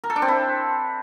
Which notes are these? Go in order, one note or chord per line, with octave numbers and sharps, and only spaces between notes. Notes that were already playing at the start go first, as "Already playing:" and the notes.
A#4
A4
D4
C4
E4